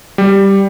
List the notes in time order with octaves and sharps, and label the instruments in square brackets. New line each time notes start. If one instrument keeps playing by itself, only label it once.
[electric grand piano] G3